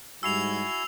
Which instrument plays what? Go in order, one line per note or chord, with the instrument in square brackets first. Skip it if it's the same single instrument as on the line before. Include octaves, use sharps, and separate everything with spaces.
[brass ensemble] G#2 G3 [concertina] E4 F#4 G#5 [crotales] E6 C7 F7